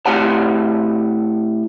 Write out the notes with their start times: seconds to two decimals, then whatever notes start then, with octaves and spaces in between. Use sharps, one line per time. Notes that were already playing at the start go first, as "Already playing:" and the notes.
0.06 A2 C4 G4 F#5 G#5 A5